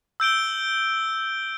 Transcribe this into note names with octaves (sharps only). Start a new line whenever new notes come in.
E6 G6 D7 G7